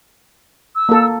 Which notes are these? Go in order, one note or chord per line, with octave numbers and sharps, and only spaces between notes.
E6
A#3 A4